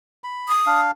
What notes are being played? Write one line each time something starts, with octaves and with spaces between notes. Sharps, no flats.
B5
D#6
D4 F5